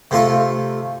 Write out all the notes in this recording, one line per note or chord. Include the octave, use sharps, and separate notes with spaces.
C3 A3 F4 A4